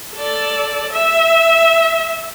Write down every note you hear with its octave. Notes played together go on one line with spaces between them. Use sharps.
A4 D5
E5